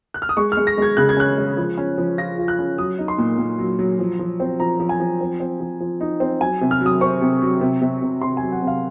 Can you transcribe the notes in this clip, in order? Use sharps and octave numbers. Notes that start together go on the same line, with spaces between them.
F#6
F6
D#6
G#3 C#6
F6
G#3
A#6
G#3 G#6
C#3 F#6
G#6
C#4 F#6
G#3
F3
C#4
F3
F4 A#6
F4
F#6
C#4
F#3 D#6
D#4
C6
A#2
A#2
F#3
F#3
F3
F3
C4
F3 A#5
F3
G#5
F3
C4
C4
F3
F3
D#4
C4
F#3 G#5
C3
F6
F#3
D#6
C4 C#6
C3
F#3
C3
C3
C3
C3 C6
F#3 G#5
F#5
C3 F5